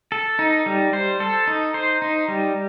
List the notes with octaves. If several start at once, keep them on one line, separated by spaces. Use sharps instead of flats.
A4
D#4
G3
C5
A4
D#4
C5
D#4
G3